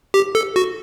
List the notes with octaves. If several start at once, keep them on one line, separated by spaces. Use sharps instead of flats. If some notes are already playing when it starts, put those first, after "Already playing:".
G4
A4
F#4